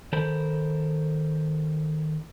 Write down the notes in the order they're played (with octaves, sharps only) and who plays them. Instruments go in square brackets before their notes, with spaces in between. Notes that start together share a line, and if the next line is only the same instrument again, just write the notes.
[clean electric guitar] D#3 A4 A#4 C5 B5